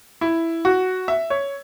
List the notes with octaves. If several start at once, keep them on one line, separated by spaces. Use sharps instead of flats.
E4
F#4
E5
C#5